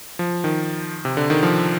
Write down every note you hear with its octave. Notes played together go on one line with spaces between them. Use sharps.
F3
D#3
C3
D3
D#3
F3